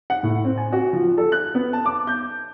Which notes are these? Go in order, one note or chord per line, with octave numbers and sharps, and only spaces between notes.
F#5
A2
C4
G#5
F#4
F3
A4
F#6
B3
A5
D6
G6